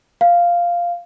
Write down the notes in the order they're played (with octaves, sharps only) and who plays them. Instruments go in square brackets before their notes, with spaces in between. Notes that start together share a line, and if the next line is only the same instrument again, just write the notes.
[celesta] F5